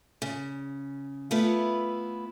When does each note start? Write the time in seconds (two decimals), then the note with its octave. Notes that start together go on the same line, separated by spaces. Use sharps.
0.22 C#3
1.31 A3 B3 E4 F4 B4